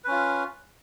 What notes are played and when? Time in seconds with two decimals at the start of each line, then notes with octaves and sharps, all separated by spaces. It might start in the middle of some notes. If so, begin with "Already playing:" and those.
0.04 B4
0.08 C#4
0.11 F4